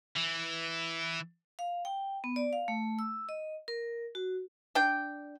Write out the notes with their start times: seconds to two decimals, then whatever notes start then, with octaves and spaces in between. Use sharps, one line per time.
0.16 E3
1.59 F5
1.85 G5
2.24 B3
2.36 D5
2.53 F5
2.68 A3
2.99 E6
3.29 D#5
3.68 A#4
4.15 F#4
4.75 D4 G5